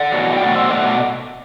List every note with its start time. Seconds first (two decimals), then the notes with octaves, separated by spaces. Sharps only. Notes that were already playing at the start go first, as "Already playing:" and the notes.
Already playing: D5 F#5
0.12 E2 B2 F#3
0.37 G5
0.41 B2 F#3 A3 D5 F#5
0.55 C5 E5
0.70 B2 F#3 A3 D5 F#5